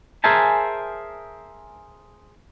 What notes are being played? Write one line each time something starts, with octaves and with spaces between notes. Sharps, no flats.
G#4 A#4 C5 E5 G#5 A5